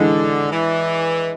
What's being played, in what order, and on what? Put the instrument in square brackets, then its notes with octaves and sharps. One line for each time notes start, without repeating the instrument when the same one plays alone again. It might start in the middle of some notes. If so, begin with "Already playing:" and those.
Already playing: [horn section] D3 [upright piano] E3 G#3 D4
[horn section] E3